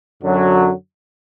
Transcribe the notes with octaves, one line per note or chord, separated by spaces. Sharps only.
F#2 D3 F#3